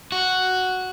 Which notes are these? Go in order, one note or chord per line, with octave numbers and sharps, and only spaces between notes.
F#4